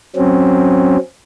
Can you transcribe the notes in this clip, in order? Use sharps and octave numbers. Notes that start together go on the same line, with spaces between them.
F#3 C4 C#4